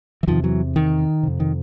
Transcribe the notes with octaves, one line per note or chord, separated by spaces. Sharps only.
E3
E2 C3 D#3 F3
E3 F#3
D#3
F2 C3
D#3